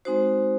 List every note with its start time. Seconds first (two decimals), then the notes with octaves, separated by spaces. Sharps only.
0.05 G#3 C4 D#4 F#4 C5